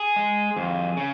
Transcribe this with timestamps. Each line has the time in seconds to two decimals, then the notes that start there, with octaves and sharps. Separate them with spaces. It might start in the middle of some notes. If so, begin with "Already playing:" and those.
Already playing: G#4
0.16 G#3
0.57 F2
0.97 C#3